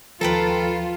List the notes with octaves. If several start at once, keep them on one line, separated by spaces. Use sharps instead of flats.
D#2 F3 F4 A4 B4 G5 A#5